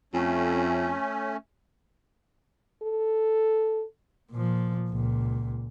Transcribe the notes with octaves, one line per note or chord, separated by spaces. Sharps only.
F2 A3 C#4
A4
A#2 F3
C#2 A#2